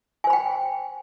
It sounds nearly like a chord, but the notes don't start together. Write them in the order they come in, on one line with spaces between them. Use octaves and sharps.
G#5 C5 B5 G5